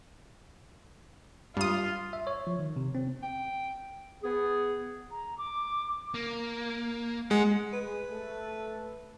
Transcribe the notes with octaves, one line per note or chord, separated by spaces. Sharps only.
G2 F4 D#6
E5
C#5
F3
D#3
C3
C4
G5
B3 G#4
A#5
D6
A#3
G#3 F#5
G#3 B4
A3 A4